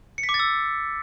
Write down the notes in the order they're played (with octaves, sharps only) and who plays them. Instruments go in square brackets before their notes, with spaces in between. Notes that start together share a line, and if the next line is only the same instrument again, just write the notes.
[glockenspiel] C#7
B6
D6
A6
E6